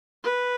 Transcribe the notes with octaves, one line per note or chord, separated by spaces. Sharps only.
B4